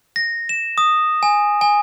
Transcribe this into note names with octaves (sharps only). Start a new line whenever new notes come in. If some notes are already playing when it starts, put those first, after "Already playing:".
A#6
E7
D#6
G#5
G#5